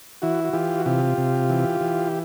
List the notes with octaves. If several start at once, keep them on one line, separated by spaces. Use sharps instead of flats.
E3 E4 F#4
F#4
E3 F4 G4
F#4
C3 F4 G4
C3
E3
E3